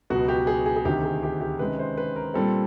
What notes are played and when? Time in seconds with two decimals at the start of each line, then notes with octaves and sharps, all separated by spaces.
0.10 C#2 B2 F#3 F#4
0.28 G4
0.47 G#4
0.66 G#4
0.76 G#4
0.85 D2 C3 D#3 G4
1.03 G#4
1.23 G4
1.41 G4
1.59 C3 D#3 G#3 C#4 B4
1.79 C5
1.98 B4
2.16 A#4
2.34 A#2 G3 C4 A4